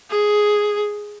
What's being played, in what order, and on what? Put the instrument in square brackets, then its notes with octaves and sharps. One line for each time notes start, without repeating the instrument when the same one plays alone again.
[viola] G#4